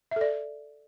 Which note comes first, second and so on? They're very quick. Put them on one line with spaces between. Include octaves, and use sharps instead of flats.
E5 A4 D5